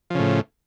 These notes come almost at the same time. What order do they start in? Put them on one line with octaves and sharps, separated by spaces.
F3 C#3 A2